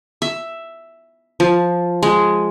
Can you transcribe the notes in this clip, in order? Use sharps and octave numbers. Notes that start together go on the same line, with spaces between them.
E5
F3
G#3